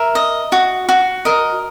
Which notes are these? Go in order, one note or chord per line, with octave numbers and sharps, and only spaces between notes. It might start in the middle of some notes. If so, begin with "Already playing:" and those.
Already playing: A#4 E5
D#5
F#4
F#4
A#4 D#5